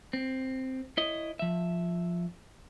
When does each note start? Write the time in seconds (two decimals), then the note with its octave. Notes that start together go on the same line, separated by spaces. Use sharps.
0.13 C4
0.97 E4 C#5 D#5
1.39 F3 E5